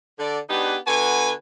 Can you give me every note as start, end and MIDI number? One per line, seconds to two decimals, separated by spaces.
0.19 0.39 50
0.19 0.39 74
0.50 0.77 59
0.50 0.77 62
0.50 0.77 63
0.50 0.77 67
0.50 0.77 68
0.50 0.77 71
0.87 1.32 50
0.87 1.32 59
0.87 1.32 66
0.87 1.32 71
0.87 1.32 80